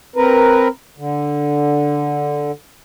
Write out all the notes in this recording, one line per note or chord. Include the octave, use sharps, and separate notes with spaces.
C4 A#4 B4
D3